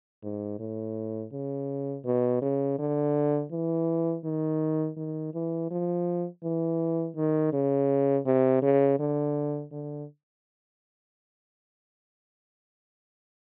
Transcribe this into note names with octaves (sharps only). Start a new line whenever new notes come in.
G#2
A2
C#3
B2
C#3
D3
E3
D#3
D#3
E3
F3
E3
D#3
C#3
C3
C#3
D3
D3